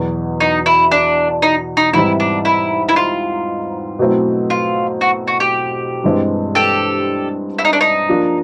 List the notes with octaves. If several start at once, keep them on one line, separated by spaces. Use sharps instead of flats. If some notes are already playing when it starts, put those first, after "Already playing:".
Already playing: E2 B2 F#3
D#4
E4
D4
D#4
D#4
G#2 E3 G3 C4 D#4 E4
D4
E4
E4
F4
B2 F#3 A3 C4 E4
F4
F#4
F#4
G4
G2 E3 G#3 C4
G4 A4
E4
D#4
D4
D#4
F3 A#3 D4 F4